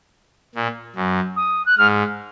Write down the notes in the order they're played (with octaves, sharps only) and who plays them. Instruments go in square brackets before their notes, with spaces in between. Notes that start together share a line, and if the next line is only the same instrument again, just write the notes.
[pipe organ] A#2
F#2
[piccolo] D#6
F#6
[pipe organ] G#2 [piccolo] F6